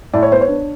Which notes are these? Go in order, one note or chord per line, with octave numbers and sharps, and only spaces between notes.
A2 D5
C#5
B3 C5
C#5
D4